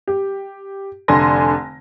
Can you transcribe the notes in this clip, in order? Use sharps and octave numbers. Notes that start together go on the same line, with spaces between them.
G4
F1 D3 G#5 C6 A#6